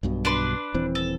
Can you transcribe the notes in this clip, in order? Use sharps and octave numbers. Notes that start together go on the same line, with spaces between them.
B1 G2 B2
D4 B4 C6
D#1 E3 C4
A4